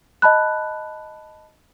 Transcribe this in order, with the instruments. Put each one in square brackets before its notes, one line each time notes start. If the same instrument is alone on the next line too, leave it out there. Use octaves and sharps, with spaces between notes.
[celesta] D#5 A5 B5 F#6